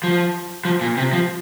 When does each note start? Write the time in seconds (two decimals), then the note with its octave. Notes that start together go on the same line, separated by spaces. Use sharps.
0.04 F3
0.65 F3
0.81 A#2
0.97 C3
1.13 F3